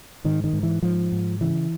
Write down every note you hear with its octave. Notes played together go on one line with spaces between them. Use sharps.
G#2 D#3
D#3
G#2
E3
G#2 F3
G#2
C#3 E3